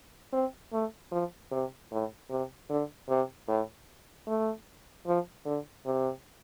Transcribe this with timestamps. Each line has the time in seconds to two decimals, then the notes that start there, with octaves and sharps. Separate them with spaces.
0.33 C4
0.73 A3
1.12 F3
1.52 C3
1.92 A2
2.30 C3
2.70 D3
3.09 C3
3.48 A2
4.27 A3
5.07 F3
5.46 D3
5.86 C3